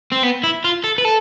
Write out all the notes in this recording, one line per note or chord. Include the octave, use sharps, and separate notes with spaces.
C4
B3
E4
F4
A4
B4
A4